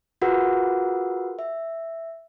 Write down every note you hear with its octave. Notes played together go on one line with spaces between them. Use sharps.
F4 F#4 G#4 A#4 B4 F#5
E5